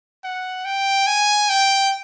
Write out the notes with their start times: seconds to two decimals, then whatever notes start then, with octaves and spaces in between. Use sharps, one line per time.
0.24 F#5
0.65 G5
1.07 G#5
1.49 G5